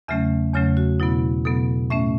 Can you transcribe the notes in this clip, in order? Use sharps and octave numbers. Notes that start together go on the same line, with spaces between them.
E2 C#3 F#3 A3 C#4 E5
E2 C#3 F#3 A3 C#4 C#5
F#4
B2 F#3 B3 E4
B2 F#3 B3 A4
A2 A3 C#4 E5